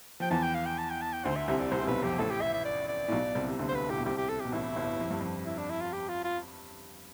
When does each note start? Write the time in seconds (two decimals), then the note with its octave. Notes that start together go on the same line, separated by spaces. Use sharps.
0.20 F3 G5
0.31 E2 E3 A5
0.43 G5
0.55 F5
0.66 G5
0.78 A5
0.90 G5
1.02 A5
1.13 G5
1.25 D2 D3 C5
1.36 E5
1.48 C2 C3 E5
1.60 D5
1.72 C2 C3 C5
1.82 C3
1.87 B1 B2 B4
2.03 F2 G4
2.18 A1 A2 A4
2.30 G4
2.41 E5
2.53 E5
2.65 D5
2.88 D5
3.08 A2
3.12 B1 B2
3.35 C2 C3
3.48 C3
3.59 D2 D3
3.69 C5
3.75 B4
3.88 A2 G4
3.97 B2
4.05 C2 C3 G4
4.17 G4
4.29 A4
4.40 B2 G4
4.52 A1 A2 E4
4.76 G1 G2
4.99 F2
5.10 G2
5.21 F2
5.46 E4
5.58 D4
5.70 E4
5.81 F4
5.92 G4
6.08 F4
6.24 F4